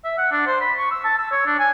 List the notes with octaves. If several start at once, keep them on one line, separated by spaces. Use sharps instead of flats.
E5
F#5
D4
C5
B5
C#6
E6
A5
E6
C#5
D4
G#5